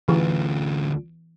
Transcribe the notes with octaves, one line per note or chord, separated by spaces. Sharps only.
D2 E3 F4